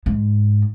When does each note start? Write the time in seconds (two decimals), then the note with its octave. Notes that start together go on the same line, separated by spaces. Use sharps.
0.06 G#2